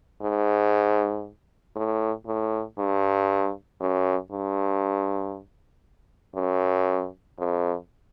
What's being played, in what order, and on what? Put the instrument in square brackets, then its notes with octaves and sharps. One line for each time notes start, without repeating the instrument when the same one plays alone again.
[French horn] G#2
A2
A2
G2
F#2
G2
F#2
F2